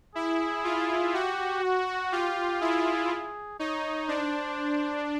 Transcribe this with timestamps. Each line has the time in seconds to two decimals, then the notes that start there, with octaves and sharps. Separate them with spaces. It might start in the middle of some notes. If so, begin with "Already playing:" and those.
0.15 E4 G#4
0.64 F4
1.14 F#4 G4
1.63 F#4
2.12 F4 G4
2.61 E4 G#4
3.11 G#4
3.59 D#4 C#5
4.08 D4 C5